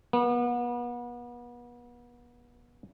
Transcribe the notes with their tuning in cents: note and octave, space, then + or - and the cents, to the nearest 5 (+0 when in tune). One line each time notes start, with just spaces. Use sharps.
B3 -35